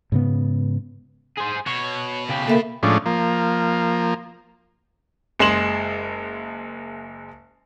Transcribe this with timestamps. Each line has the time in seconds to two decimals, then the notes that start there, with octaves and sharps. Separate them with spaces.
0.12 G#2 C#3 B3
1.37 G#4 C5
1.67 B2 C#5
2.30 C#3 G4
2.48 A#3 A4 E5 B5
2.83 A2 F3 G#3 C#4 D4
3.06 F3 A#3
5.39 F#1 G#3 C6 E7 F#7